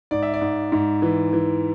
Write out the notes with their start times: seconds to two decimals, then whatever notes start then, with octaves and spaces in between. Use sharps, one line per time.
0.11 G#2 D5
0.23 E5
0.34 D5
0.41 G#2
0.72 G#2
1.02 E3
1.33 E3